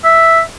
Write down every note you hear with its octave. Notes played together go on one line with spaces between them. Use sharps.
E5